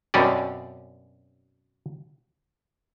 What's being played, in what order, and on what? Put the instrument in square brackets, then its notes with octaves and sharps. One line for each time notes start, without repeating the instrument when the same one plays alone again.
[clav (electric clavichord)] F#2 B2 G3 C4 C#4 D5